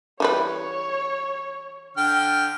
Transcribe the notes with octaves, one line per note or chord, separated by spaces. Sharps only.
E3 G3 B4 C#5
D3 G5 F6